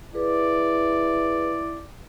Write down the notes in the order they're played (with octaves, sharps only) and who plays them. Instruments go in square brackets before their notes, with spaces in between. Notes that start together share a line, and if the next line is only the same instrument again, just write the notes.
[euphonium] E4 [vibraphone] G#4 B4 [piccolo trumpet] D5